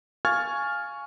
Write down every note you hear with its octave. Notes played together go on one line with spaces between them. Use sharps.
F5 G#5 C#6 F6 G#6 A6